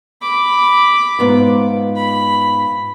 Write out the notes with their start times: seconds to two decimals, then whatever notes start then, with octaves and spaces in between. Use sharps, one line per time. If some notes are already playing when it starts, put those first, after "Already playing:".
0.22 B5 D6
1.19 G#2 B3 F4
1.96 B5